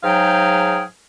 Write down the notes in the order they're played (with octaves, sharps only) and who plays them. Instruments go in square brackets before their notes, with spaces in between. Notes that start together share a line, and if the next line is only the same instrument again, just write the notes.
[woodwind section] G#2 F#3 D#4 G#4 F5 G5